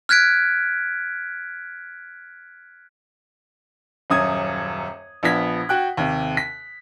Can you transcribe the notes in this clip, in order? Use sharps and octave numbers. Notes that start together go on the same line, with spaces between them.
F6 F#6 G#6 B6 D7
D#1 F#2 D#6 G#6
A#1 F3 B3 G#6 B6
F#4 G5 F#6
D#2 C3
B6